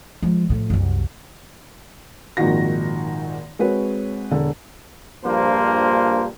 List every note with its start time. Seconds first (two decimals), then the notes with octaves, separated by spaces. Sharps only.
0.22 F3 G#3
0.50 A2 F3
0.70 C2 F#2
2.37 G#1 A#2 D#3 F3 F#4 A#6
3.59 G#3 C4 F#4 B4 C#5
4.31 E1 D3
5.25 A#1 G2 F3 A#3 C5